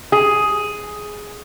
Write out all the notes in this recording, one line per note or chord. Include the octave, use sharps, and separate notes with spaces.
G#4